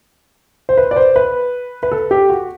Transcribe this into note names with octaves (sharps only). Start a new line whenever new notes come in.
C5
B4
D5
C5
B4
B4
A4
G4
F#4